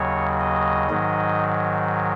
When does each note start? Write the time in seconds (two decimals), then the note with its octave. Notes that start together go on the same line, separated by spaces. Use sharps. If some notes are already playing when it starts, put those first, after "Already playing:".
Already playing: D#2 C#3 F#3 C#5
0.40 D#5
0.90 G#2 D#3 F#3